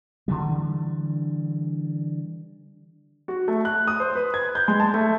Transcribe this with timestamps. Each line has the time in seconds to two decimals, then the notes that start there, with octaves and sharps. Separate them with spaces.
0.28 D3 E3 G3
3.28 F#4
3.48 A3
3.65 F#6
3.88 D#6
4.00 C5
4.15 B4
4.34 G#6
4.55 G6
4.68 G#3
4.80 A5
4.94 A3